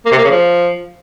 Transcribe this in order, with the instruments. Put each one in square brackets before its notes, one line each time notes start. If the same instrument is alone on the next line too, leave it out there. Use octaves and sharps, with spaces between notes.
[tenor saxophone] A#3
C3
A#3
C#3
F3